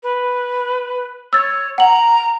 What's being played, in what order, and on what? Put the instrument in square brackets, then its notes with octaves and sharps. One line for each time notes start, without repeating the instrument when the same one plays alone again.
[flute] B4
[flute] C#5 [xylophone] E6 A6
[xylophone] F#5 F#7 [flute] A#5